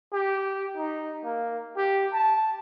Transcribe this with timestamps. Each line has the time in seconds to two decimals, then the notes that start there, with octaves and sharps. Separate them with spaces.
0.13 G4
0.77 D#4
1.24 A#3
1.77 G4
2.13 A5